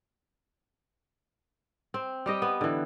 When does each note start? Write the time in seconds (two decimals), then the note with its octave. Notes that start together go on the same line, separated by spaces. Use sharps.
1.94 C4
2.26 G3 G4 D#5
2.42 B3
2.61 D3 E3